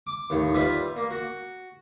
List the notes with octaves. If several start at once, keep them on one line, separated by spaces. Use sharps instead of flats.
D6
D#2 A2
G3 F4 B4 E5
A#3
F#4